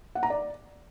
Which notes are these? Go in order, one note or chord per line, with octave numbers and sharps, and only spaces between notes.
F#5
A#5
D5